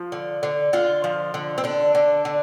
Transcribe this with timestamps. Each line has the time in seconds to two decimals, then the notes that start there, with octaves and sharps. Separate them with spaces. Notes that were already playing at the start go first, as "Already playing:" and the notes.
Already playing: F3
0.12 D3
0.43 D3
0.73 D3 F4
1.04 F3
1.34 D3
1.58 C4
1.64 D3 D4
1.95 D3
2.25 D3